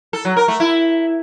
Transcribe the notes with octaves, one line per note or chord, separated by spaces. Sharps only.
A4
F#3
A#4
A3
E4